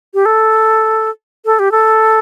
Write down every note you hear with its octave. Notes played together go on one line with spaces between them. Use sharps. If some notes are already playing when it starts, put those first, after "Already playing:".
G4
A4
A4
G4
A4